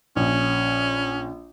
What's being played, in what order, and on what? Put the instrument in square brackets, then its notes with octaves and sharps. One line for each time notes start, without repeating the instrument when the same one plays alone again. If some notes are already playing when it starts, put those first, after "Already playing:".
[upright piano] A#1 [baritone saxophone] C#4